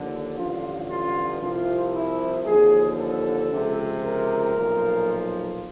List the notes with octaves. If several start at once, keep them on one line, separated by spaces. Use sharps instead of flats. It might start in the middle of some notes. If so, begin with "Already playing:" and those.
Already playing: D#2 D3 F3
A1 G2 D3 F3 F4
F4
C2 C3 F3 F4
E4
D#2 D3 F3 G#4
A4
C#2 C3 F3
A#4
B1 A#2 F3